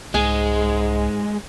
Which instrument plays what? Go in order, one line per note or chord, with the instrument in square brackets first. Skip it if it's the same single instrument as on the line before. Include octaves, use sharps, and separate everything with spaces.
[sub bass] C2 [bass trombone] G#2 [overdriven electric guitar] G#3 [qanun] G#4 G#5